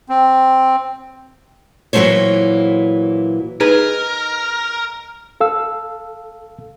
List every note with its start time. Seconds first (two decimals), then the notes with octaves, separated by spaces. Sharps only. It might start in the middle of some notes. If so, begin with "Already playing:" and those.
0.09 C4
1.93 A#2 E3 F#3 A3 C5 C#5
3.60 D#4 G#4 A#4 B4
5.41 A4 F5 E6